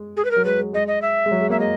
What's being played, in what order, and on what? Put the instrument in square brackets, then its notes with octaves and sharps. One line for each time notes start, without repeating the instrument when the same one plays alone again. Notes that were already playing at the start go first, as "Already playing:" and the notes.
Already playing: [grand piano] G#3
[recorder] G#4
B4
A#4
[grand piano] F#3
[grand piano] G#3 [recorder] B4
[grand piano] G#3
[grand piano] G#3 [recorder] D#5
[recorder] D#5
E5
[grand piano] G#3
F#3
G#3
[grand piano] A#3 [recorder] E5
[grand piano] G#3 [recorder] D#5